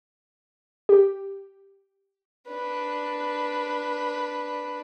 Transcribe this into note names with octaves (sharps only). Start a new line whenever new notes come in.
G4
D4 B4